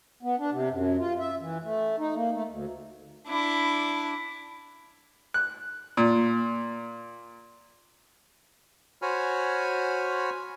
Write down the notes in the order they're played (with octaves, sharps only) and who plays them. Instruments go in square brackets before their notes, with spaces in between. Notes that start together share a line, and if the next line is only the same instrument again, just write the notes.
[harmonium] B3
D4
C3
F#2
F4
E5
E3
A3
D#4
A#3
A3
D2
[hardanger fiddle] D4 E4
[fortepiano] F#6
A#2
[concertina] F#4 C5 C#5 G#5 B5 F6